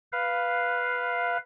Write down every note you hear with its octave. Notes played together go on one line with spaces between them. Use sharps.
B4 F5